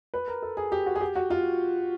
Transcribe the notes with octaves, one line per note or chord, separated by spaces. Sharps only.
B4
A#4
A4
G#4
G4
F#4
G#4
G4
F#4
F4